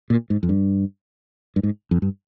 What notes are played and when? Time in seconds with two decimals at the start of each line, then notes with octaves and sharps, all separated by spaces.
0.10 A#2
0.30 G#2
0.43 F2
0.49 G2
1.56 G2
1.63 G#2
1.91 F2
2.02 G2